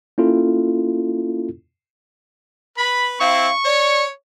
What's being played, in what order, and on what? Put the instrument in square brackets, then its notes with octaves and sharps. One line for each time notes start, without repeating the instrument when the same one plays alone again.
[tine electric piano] A#3 C#4 E4 F4 A4
[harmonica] B4 [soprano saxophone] B5
[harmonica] C4 E4 [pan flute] F5 [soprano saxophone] C#6
[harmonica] C#5 [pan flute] D5